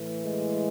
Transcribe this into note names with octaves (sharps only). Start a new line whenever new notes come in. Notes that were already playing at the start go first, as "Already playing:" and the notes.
Already playing: A2 E3
G#3